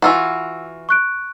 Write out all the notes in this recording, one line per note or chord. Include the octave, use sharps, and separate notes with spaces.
E3 F4 F#4 F#5 E6
C#6 F#6 D7